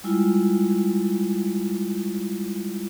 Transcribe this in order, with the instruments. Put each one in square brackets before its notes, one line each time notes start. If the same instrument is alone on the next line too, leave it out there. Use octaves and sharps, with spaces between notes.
[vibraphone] G3 G#3 E4 F4